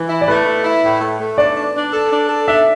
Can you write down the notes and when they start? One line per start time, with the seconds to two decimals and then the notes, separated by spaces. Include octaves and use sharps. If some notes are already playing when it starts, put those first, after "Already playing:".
Already playing: E3
0.09 E4
0.21 D5
0.28 A3 B4
0.46 E4
0.64 E4
0.83 A2
1.01 A3
1.19 A3
1.38 D4 D5
1.56 D4
1.74 D4
1.93 A4
2.11 D4
2.29 A4
2.47 D4 E5